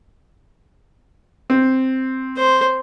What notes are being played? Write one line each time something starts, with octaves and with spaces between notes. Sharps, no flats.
C4
C5